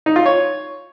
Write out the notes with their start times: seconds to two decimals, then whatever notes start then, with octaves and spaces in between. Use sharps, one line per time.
0.06 D#4
0.16 F4
0.26 C#5